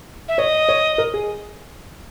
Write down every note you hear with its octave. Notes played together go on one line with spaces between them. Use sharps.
E5
C#5 D#5
C#5
A#4
G#4